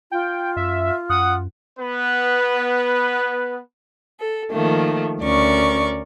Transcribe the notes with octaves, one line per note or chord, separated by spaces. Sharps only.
F4 G5
F#2 E5
F#2 F#5 D#6
B3 B4
A4
D#3 F3 A3 A#3
D2 C#4 A#4 D5 C#6